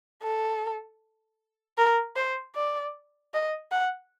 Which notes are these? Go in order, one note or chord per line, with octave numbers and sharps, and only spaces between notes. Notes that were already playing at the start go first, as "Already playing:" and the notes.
A4
A#4
C5
D5
D#5
F#5